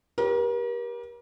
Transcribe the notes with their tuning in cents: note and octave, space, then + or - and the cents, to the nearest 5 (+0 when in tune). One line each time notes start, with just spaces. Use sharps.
G4 +0 A#4 +40 C#5 -40